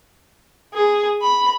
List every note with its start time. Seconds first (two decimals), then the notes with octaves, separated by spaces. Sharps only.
0.73 G#4
1.21 B5